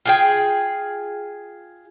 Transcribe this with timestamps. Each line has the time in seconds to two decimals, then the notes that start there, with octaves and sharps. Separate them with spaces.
0.05 F4 G#4 G5